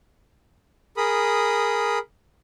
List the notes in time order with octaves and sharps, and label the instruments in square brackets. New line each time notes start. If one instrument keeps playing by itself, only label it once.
[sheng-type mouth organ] G#4 A#4 B5 D#6